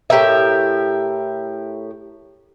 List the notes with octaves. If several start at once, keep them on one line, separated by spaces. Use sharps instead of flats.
A2 G4 A#4 E5